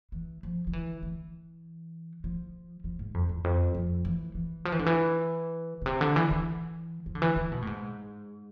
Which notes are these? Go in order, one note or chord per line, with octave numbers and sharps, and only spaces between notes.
E3
F3
F3
E3
E3
F3
F3
G#2
F2
E2
F2
F2
E3
E3
F3
E3
D3
E3
B2
C3
D3
E3
E3
F3
D3
E3
E3
B2
A2
G#2